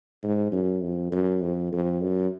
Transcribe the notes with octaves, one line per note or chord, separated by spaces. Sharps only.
G#2
F#2
F2
F#2
F2
F2
F#2